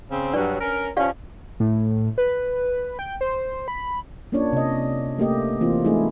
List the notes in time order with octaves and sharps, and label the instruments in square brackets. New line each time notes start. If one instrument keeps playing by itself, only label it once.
[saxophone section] C#3 C4
[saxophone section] G2 F#3 [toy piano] D4 B4 D5
[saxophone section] C#4 A#4
[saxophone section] F3 C#4 [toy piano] G4 D5 F5
[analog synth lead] A2
B4
G5
C5
B5
[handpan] A#3 C#4 D4 F4 C#5 D5
C3 D#5
A3 A#3 G4 D#5
E3 A#3 C4 F4
G#3 A3 D#4 E4 G#4